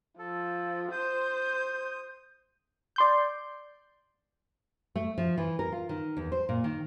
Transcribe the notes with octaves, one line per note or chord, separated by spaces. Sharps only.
F3 A4
C5 D#6 G6
D5 C6 G6
A3
F3
E3
A#4
F4
D#3
E2
C5
A#2
D#3